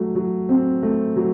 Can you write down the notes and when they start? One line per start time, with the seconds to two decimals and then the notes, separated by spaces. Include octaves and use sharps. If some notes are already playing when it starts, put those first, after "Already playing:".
Already playing: F#3 A3
0.15 F#3
0.49 C4
0.83 A3
1.16 F#3